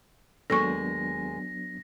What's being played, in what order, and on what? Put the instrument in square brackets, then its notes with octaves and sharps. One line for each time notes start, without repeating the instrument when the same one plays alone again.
[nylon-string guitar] D#2 G#3 [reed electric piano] F#3 B3 D4 [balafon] A4 C#6 [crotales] A#6